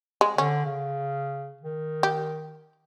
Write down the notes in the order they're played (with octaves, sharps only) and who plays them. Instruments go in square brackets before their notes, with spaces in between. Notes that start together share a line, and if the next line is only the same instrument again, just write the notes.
[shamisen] G#3
[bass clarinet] D3 [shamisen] C#4
[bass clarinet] C#3
D#3
[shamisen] G4